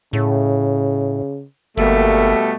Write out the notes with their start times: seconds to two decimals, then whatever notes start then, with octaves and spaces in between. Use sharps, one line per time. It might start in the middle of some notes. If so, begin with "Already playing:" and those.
0.13 A2 C#3
1.77 G1 B2 G3 A3 A#3